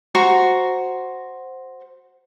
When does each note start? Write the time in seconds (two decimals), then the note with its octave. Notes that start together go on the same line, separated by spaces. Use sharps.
0.15 F#4 C5 A#5 C#6